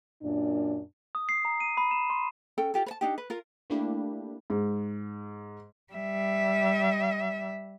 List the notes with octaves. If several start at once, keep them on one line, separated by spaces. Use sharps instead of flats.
F#2 A#2 D4
D#6
C7
A#5
D#7
B5
E7
C6
C#4 A4 G5
F4 G4 A4
B4 A5
D4 D#4 G4
B4
F4 A#4
A3 A#3 D4 E4 G4
G#2
G3 E5